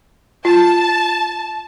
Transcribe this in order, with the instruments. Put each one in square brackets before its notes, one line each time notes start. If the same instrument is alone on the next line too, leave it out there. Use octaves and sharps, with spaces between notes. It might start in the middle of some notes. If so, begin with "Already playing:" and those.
[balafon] F4 [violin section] A5